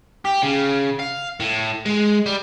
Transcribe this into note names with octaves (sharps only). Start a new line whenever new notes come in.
G4
C#3
F5
A2
G#3
G3